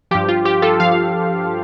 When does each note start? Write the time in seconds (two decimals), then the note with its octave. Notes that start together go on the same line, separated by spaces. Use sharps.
0.11 G2 F3 G4
0.29 F4
0.45 G4
0.62 F4 A4
0.80 F3 F5